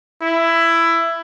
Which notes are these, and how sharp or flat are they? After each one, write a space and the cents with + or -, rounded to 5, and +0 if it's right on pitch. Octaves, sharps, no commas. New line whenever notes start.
E4 +15